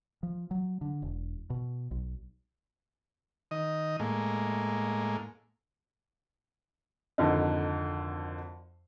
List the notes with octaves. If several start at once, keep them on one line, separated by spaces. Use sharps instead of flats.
F3
F#3
D3
E1
B2
B1
D#3 D#5
A2 G#3 A#3
G#1 F2 D3 D#4